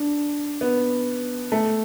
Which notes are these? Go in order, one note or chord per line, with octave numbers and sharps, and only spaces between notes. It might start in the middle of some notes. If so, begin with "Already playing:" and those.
Already playing: D4
B3
A3